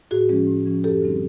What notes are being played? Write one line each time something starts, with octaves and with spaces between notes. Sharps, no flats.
A2 F#4 G#4
F3 G#3 C#4
A2
F3 G#3 C#4
F#2 G4 A4
D3 G3 C4 D#4